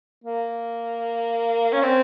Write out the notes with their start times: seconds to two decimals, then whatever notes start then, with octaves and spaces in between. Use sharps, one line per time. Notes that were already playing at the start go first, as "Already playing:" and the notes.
0.24 A#3
1.73 C#4
1.83 C4